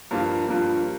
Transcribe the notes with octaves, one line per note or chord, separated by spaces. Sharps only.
G2 F3 A#3 F4
G2 F3 A#3 F4